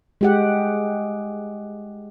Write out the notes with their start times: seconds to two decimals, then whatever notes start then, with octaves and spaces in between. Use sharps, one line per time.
0.21 G#3 G4 F#5